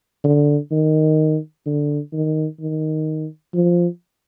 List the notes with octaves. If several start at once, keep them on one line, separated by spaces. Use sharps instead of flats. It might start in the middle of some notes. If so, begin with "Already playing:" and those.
D3
D#3
D3
D#3
D#3
F3